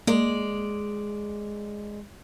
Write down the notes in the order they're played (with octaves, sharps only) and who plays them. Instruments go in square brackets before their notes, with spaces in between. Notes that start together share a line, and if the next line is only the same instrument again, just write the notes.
[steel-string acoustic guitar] G#3 D5 [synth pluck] A#3